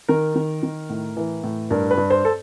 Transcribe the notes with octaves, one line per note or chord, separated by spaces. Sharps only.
D#3 A#4
D#3
D#3
A2
E3
A2
G2 A#4
B4
G2
C5
A4